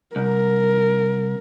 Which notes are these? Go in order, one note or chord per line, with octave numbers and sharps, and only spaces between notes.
C2 A#4